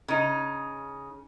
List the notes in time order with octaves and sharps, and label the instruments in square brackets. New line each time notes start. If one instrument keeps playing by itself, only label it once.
[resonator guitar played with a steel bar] C#3 D#4